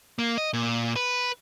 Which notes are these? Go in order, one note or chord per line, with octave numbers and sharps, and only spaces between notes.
A#3
D#5
A#2
B4